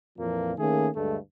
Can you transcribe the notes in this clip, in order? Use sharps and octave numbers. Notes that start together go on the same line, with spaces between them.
F2 A#2 E3 F3 A#3
D#3 A3 A#3 C#4 G#4
D2 G2 G#3 A3